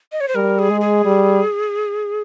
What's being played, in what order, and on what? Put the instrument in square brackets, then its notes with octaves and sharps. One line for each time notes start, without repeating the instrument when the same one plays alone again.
[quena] D#5
C#5
C5
[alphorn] G3 [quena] A#4
[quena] G#4
[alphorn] G#3
[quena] G#4
[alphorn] G3